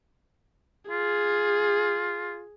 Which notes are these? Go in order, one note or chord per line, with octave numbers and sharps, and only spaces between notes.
F4 G#4